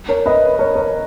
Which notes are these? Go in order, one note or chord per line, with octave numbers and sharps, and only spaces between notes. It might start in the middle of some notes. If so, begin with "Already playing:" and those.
A#4 C#5
B4 D#5
A#4 C#5
A#4 C#5